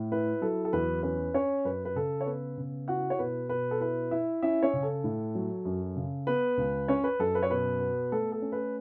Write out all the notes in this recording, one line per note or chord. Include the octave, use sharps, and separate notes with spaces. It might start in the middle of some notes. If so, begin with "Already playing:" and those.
Already playing: A2
E4 B4
F#3 A4
A4
E2 B4
C#4 B4
C#4 C#5
F#2 B4
B4
C#3 A4
C#5
B3 B4
C#3
E4 F#4 F#5
C#5
B2 B4
B2 B4
A4
E4 B4
E4 E5
C#4 E4 E5
C#4 C#5
C#3
A4
A2
F#3
F#2
C#3
B3 B4
C#2
C#4 C#5
B4
F#2 A4
B4
C#5
B2 B4
B3
A3 A4
A4
C#4
B4